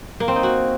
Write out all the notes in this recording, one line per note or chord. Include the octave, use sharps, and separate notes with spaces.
A#3
C4
D#4
F#4